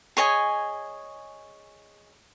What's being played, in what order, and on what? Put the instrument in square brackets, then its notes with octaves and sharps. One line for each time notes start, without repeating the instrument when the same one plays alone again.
[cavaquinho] G#4 C#5 D#5 G#5